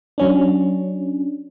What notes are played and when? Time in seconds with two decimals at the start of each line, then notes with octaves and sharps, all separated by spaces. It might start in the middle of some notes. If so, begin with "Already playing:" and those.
0.18 F#3 C#4 D4